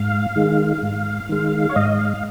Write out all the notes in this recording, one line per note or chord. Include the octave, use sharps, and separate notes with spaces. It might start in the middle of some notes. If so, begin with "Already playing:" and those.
Already playing: G#2 F5
D#3 G#3
G#2
D#3 G#3
C#5
G#2 D#5
F5